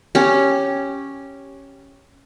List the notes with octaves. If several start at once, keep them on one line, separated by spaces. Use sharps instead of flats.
C#4 G4